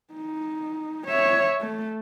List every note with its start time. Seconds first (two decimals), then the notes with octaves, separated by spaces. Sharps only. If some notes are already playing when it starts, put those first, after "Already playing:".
0.13 D#4
1.07 C#5 E5
1.61 A3